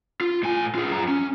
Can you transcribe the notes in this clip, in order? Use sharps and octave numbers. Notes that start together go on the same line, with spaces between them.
F4
A2 G#5
F4 G#4
F#2 A#5
C#4